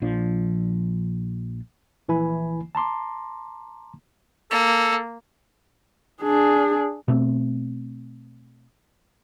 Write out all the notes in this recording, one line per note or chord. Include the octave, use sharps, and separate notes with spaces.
A#1 F3 D4
A#1 E3 E4 G#5 B5
A5 A#5 C6 D6
A#3 A4
D4 G#4
B2 A3 C4